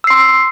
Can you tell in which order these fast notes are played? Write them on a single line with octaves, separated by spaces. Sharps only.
E6 C7 C6